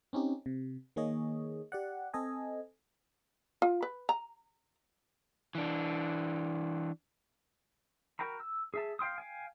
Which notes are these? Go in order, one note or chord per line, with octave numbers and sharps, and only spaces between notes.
C4 C#4 D#4 G4
C3
D#3 A#3 G#4 C#5 D#5
G4 D5 F#5
C4 A4 D#5 G#5
F4
B4
A#5
E3 D4
F#4 A#4 G5 A#5 B5
E6
G#4 E5 A5
F5 G5 C6 D#6
F5 G5 G#5